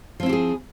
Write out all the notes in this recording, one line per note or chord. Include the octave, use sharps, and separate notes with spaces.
F3 C4 E4 G4 G#4